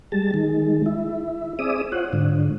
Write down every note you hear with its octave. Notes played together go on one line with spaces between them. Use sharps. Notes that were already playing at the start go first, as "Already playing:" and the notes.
G3 G#3 A5
D#3 G#3
E4
C4 G#4 D5 E5 D#6
F4 C5 C#5 F#5
G#2 D3